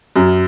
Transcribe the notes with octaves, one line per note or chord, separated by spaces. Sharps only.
F#2